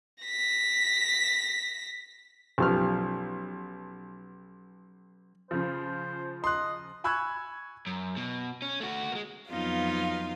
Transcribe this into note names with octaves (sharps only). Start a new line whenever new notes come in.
A#6 B6
B1 F3 F#3 C#4 G4 F6
C#3 F3 C5
D#5 C6 F#6
G#5 B5 C#6 E6 F#6 G#6
F#2
B2
C#4
A3 F#4
G#3 A#3
F2 F#3 B3 D#4 F4 F5